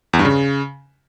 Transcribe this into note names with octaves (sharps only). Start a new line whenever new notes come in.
E2
G2
C#3